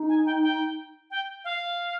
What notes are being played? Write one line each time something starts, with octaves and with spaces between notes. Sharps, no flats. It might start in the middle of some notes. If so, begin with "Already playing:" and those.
Already playing: D#4
G#5
G5
G5
G5
F5